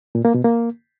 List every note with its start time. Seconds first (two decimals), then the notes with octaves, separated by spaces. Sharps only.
0.15 A#2
0.25 A#3
0.34 B2
0.44 A#3